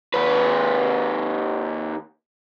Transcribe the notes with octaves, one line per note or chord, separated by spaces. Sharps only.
D#2 B4